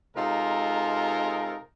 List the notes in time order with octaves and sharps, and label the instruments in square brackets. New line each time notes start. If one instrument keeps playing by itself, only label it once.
[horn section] C3 G#3 D#4 F4 A4 A#4